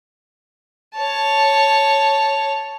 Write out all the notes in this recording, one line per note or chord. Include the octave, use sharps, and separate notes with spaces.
C#5 A5